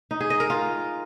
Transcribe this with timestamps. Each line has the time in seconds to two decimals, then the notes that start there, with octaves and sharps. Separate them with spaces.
0.11 D#4
0.21 G#4
0.30 D#5
0.40 A#4
0.50 F4